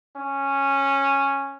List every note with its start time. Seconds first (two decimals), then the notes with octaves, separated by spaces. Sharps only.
0.16 C#4